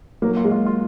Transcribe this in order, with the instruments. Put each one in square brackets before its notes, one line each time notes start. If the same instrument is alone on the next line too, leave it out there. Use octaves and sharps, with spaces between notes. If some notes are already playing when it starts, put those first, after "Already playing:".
[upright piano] F#3 [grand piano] A#3
[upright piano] F4
[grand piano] G#3
[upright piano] F4
F4